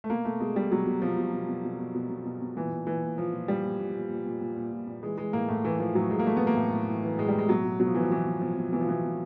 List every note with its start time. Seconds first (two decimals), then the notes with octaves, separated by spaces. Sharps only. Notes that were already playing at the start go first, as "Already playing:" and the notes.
0.04 A3
0.10 B2 A#3
0.25 B2 A3
0.40 B2 G#3
0.55 B2 G3
0.72 B2 F#3
0.87 B2
1.02 B2 F3
1.18 B2
1.33 B2
1.48 B2
1.64 B2
1.79 B2
1.95 B2
2.10 B2
2.25 B2
2.41 B2
2.56 A#2 E3
2.71 A#2
2.87 A#2 E3
3.03 A#2
3.18 A#2 F3
3.33 A#2
3.48 A#2 G3
3.64 A#2
3.80 A#2
3.96 A#2
4.10 A#2
4.26 A#2
4.41 A#2
4.57 A#2
4.72 A#2
4.87 A#2
5.03 E3 G#3
5.18 E3 G#3
5.33 A2 A#3
5.48 A2 A3
5.65 E3
5.79 E3 F3
5.95 A2 F#3
6.10 A2 G#3
6.19 A#3
6.26 E3 A3
6.37 E3 B3
6.47 A#3
6.56 A2 A3
6.73 A2
6.88 E3
7.03 E3
7.18 A2 G#3
7.28 G3
7.35 A2 G#3
7.49 B2 F#3
7.64 B2
7.80 B2 F#3
7.87 F3
7.95 B2 E3
8.02 F3
8.11 B2 E3
8.26 B2
8.41 B2 F3
8.57 B2
8.72 B2 E3
8.81 F3
8.88 B2 E3
9.04 B2